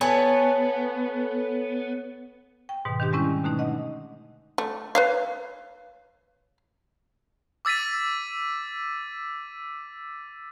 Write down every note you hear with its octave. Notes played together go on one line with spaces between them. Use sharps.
B3 A4 C#5 G#5
G5
G#2 B2 D#3
D#3 D4 G4 G5
D3 G3 G#3 C4 C#4 E4
B2 D3 A3 D#4
D4 D#5 F#5
A3
B4 C#5 F5
D6 E6 A6 B6 D#7